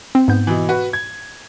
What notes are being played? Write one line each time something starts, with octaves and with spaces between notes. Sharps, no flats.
C4
G#2 B3 G6
B2 E3
F#4 B4
G#6